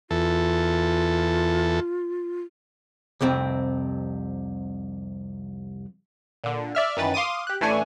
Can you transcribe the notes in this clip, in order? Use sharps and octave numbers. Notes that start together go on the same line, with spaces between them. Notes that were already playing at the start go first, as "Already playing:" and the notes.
E2 F4 A4
C2 F2 C3 C4
A#2 D3
D5 E5 F6
F#2 D#3 E3 B4 A6
F5 C6 D6 D#6 D#7
G4 F#6
A1 E3 A3 D4 G#5 C#6